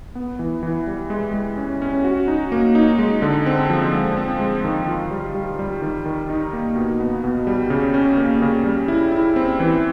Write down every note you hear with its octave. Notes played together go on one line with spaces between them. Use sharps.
B3
E3
E3
G3
G#3
G#3
C#4
C#4
F#4
D#4
A#3
D#4
G#3
D3
C4
F3
G#3
C4
G#3
D#3
F4
G3
G3
G3
D#3
D#3
D#4
A#3
B2
B3
B2
G3
C#3
C#4
A#3
C#3
G3
E4
E4
C4
E3